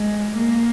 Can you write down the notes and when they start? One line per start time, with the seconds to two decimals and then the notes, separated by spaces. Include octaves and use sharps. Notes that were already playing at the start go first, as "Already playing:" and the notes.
Already playing: G#3
0.39 A#3